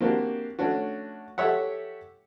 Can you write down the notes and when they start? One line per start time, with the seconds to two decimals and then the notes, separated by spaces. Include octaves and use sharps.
0.01 A#3 C4 D4 F#4 G4
0.59 A3 C#4 D4 F#4
1.38 G4 A4 C#5 E5 F#5